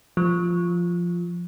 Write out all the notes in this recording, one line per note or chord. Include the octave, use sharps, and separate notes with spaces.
F3